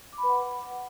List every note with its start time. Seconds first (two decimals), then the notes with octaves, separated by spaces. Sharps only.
0.13 D6
0.18 B5
0.23 B4
0.29 F#5